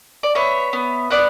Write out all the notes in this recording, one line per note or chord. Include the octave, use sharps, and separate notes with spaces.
D5
B3 C#5 E5
B3
B3 D5 F#5